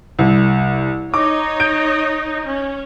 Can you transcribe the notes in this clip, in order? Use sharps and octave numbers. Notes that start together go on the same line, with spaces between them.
C2
D#4 C#5 D#5 D6
G6 D7
C#4